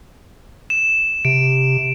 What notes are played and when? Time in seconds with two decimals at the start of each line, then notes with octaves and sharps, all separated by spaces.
0.70 E7
1.25 C3 D7